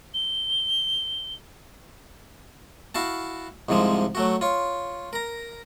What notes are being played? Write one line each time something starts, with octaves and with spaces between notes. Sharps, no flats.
G7
E4 F#4 F5 A5
C2 G#2 C3 F3 G#3
F#3 A3 F#4
F4 C#5
A#4 A#5